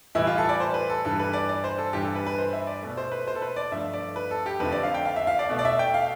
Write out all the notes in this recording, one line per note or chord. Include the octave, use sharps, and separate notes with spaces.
A2 E3 G3 E4
F4
A4
D5
C5
B4
A4
G2 E3 G3 A4
B4
D5
D5
C5
A4
G2 E3 G3 G4
A4
B4
B4
C5
E5
D5
B2 A3
C5
B4
C5
A4
B4
D5
G2 F3 A3 E5
D5
B4
A4
G4
F2 D3 F3 A3 B4
D5
F5
G5
F5
E5
F5
D5
B2 A3
D5
E5
G5
F5